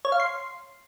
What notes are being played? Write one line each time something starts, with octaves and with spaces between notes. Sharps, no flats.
C#5
F5
C6